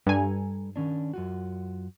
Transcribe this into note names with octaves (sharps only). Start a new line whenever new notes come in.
G2 G3 A4 G#5 A#5
D#3 C#4 D4
F#2 F4 F#4